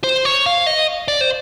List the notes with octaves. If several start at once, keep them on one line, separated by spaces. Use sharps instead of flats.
C5
C#5
F5
D#5
D5
C5